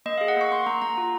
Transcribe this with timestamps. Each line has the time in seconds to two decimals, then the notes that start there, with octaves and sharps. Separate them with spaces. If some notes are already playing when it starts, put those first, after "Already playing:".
0.06 A#3 D#5
0.18 F5
0.21 G#4
0.28 F#5
0.37 A#3 C#6
0.52 A#3 C6
0.67 A#3 A#5
0.82 A#3 A#5
0.98 F4